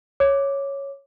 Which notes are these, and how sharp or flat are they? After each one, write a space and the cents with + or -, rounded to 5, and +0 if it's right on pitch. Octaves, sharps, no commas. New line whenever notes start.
C#5 +0 D6 +0